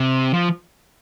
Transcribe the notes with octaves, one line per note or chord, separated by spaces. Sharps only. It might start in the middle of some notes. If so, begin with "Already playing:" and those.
Already playing: C3
F3